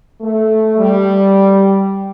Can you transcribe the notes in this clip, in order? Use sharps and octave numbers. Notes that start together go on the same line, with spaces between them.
A3
G3